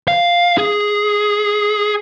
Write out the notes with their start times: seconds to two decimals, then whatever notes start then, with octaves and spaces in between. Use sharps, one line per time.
0.08 F5
0.58 G#4